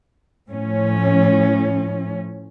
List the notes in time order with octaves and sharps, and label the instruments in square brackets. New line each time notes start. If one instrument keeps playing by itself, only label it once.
[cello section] A2 F3 C#4